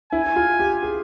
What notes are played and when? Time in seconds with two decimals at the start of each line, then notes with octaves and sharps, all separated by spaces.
0.12 E4 G#5
0.36 F4
0.60 G4
0.83 G#4